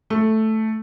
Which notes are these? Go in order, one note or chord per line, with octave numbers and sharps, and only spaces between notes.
A3